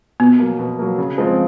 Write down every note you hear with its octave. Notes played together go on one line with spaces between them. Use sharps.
B2 B3
F#3 A#3
B2
F#3 A#3
C#3
F3 G#3 C4 F4